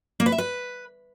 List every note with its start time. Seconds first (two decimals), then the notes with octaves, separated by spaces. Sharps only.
0.20 A#3
0.26 B4
0.32 E5
0.38 B4